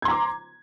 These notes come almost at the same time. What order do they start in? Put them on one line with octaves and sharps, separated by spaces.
G#6 C6 A#5 D6